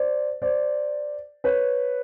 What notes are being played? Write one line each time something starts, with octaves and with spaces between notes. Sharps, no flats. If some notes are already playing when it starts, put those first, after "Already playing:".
Already playing: C5 D5
C5 D5
B4 C#5